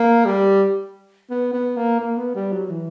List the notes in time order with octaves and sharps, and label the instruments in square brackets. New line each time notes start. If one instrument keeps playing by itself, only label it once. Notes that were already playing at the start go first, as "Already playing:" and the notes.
Already playing: [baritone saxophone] A#3
G3
B3
B3
A#3
A#3
B3
G3
F#3
E3